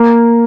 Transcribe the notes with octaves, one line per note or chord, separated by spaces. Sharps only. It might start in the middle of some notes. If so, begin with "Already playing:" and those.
Already playing: A#3